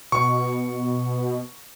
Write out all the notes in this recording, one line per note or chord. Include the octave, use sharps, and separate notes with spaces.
B2 C#6